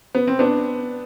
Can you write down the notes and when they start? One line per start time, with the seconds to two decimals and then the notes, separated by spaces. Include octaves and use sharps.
0.15 B3
0.27 C4
0.39 B3 D4